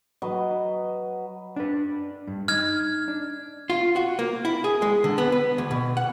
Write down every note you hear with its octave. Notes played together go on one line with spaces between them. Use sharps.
F#3 B4 D#5
D4 B4
G2
D#4 F6 G#6
D4
F4
F#4
A#3
E4
G#4
G#3
D3
B3
B4
D2
B2
F#5